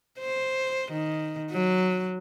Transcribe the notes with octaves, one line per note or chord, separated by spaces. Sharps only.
C5
D#3
F#3